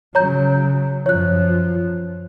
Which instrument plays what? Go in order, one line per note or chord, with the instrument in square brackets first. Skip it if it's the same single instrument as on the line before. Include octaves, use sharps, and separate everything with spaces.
[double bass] C#3 F#3 [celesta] C#5 A#5 G6
[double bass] F#2 F3 [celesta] C#5 F#6